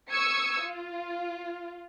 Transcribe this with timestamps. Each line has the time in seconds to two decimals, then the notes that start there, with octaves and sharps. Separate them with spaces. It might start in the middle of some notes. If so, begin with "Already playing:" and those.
0.11 C#6 D#6 E6 G#6 C#7
0.63 F4